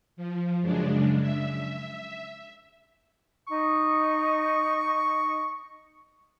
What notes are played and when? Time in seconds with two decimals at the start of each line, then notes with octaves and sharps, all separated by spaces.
0.16 F3
0.62 F#2 C#3 G#3 D4
1.21 E5
3.47 D#4 C#6